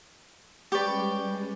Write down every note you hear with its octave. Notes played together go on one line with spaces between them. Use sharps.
G3 G#3 C#4 G4 B4 D5 C#6 G6